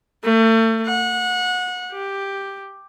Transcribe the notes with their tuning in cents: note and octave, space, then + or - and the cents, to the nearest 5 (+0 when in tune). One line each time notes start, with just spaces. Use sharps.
A3 +35
F#5 -25
G4 +5